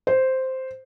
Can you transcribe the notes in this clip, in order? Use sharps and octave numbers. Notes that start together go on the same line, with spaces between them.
C5